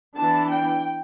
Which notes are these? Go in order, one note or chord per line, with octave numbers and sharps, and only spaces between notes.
E3 B3 D4 A5
G5